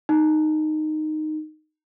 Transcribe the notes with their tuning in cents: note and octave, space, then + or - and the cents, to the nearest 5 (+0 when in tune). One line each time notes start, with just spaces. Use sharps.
D#4 -10